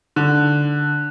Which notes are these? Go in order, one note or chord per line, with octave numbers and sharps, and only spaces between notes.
D3